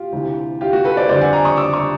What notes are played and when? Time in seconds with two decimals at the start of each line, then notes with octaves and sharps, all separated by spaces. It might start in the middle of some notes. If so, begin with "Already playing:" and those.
Already playing: F4 G4
0.12 D2 C3 E3
0.61 F4 G4
0.73 F#4
0.85 A4 B4
0.97 C5 D5
1.09 F2 D3 G3 C5 D5
1.21 F#5 G#5
1.33 G#5 A#5
1.45 C#6 D#6
1.57 D6 E6
1.73 C#6 D#6